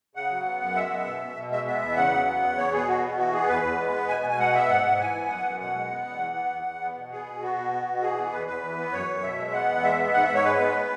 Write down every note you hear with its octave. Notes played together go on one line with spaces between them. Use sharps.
C#3 F#5
F#3
B3
F#2
G#3 E5
B3
B2
B2
B2
G#3 E5
B3 E5
E2
C#3 F#5
F#3
B3
E2
B3 C#5
B2 G#4
B3 F#4
B2
E3 F#4
B3 G#4
E2 B4
E2
G#3
B3
B2 G#5
B2
G#5
G#3 F#5
B3 E5
G#2 F#5
G#2
E3 G#5
B3
F#2 F#5
F#2
B2 F#5
G#3
B3
E2
E3
B3
E2
E2
B3
B2
B3 G#4
B2
B3 F#4
B2
B3
B2
E3 G#4
B3
E2 B4
E2 B4
E3
B3
F#2 C#5
F#2
B2 E5
G#3
B3 F#5
E2
G#3 E5
B3
G#2 F#5
E5
G#2
C#5
G#3 B4
B3